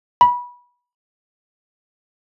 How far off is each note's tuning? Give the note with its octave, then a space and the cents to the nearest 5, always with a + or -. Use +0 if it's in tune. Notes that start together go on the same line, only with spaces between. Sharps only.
B5 -20